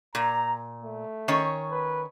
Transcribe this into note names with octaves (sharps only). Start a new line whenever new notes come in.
A#2 A#5
A3
D#3 C#4 C#5
B4